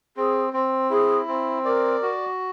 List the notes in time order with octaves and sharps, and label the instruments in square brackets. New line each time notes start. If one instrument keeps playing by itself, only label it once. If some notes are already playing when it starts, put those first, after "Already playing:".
[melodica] C4 [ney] G#4
[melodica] C4
[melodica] E4 [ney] G#4
[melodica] C4
[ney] A#4 [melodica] D5
[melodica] F#4